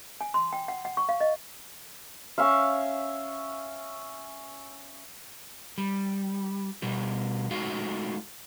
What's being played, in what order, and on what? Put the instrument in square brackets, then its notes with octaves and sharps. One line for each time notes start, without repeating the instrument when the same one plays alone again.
[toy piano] G#5
C6
G5
F#5
F#5
C#6
F5
D#5
[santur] C#4 E5 F5
[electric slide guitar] G3
B2 G3 G4
G#3 A3 D#4 F4 F#4 F5